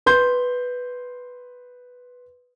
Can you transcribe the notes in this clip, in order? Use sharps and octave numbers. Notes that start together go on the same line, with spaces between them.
B4 C6 G6